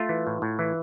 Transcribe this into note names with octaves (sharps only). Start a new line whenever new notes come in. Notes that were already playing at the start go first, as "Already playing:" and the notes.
Already playing: A3 F4
E3
A2
A2
E3